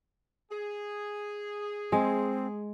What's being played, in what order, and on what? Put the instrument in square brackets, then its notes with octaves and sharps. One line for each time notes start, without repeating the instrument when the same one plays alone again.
[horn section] G#4
[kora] G#3 [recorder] C4